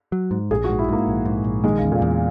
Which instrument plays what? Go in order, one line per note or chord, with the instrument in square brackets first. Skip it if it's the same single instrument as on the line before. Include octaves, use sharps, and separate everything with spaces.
[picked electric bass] F#3
G#2
[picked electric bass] A#1 [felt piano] G#4
[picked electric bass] G#2 [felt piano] F#4
[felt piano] E4
[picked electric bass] G#2 [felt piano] A#3
[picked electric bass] A#1
G#2
A#1
[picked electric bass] D#3 [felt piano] G#3
[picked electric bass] E2 [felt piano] C#3
[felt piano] A#2
[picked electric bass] E2